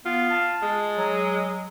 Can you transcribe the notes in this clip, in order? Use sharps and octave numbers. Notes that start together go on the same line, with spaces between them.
B3 F4
A5
G#3
F#3